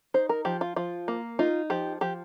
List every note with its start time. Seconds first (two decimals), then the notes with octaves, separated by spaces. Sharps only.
0.14 D#4 C5
0.29 A#4
0.45 F3 G4
0.61 F4
0.76 F3 F4
1.08 A#3
1.39 D#4 F4
1.70 F3 G4
2.01 F3 G4